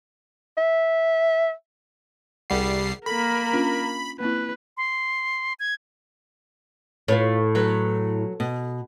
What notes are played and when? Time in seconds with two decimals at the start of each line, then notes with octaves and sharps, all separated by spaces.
0.58 E5
2.50 C2 G3 G#4 A#4 F#5 C7
3.06 A#3 A4 A#4 B5
3.53 C#4 D4 F4
4.20 A#3 C4 E4 B4
4.77 C6
5.60 G#6
7.08 A2 F4 B4 C#5
7.55 F#3 A4 B4
8.40 B2